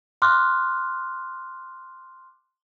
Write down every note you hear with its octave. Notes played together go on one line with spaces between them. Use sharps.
C6 D6 F6 F#6